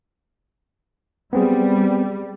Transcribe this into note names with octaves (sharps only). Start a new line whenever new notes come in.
G3 B3 C4 G#4